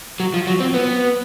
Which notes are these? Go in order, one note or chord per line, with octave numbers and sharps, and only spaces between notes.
F#3
F3
F#3
C4
B3